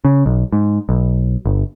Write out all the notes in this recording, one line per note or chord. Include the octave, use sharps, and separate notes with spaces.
C#3
B1
G#2
B1
G1